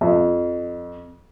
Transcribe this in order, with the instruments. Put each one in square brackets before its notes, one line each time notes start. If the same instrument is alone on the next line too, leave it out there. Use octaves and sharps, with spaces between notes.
[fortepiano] F2